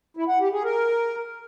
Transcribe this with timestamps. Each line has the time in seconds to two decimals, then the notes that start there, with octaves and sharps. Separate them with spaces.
0.17 E4
0.29 F#5
0.40 G4
0.52 G#4
0.64 A#4